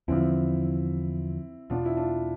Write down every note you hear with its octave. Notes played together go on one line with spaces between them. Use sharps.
E2 D3 F3 C4 E4
E2 B2 B3 D4 F4
E4
D4 F4